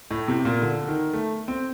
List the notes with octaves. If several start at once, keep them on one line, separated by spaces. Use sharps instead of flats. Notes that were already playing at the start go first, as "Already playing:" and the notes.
A2
C3
A#2
D3
D#3
A3
C4